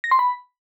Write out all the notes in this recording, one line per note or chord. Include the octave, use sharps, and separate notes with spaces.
A#6
C6
B5